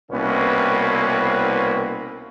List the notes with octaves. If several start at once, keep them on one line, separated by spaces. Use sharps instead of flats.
C2 B2 A#3 C4 C#4 B4